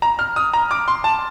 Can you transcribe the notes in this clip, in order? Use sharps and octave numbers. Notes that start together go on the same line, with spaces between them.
A#5
F6
D#6
A#5
D6
C6
A5